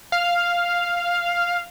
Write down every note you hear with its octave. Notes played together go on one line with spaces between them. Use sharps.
F5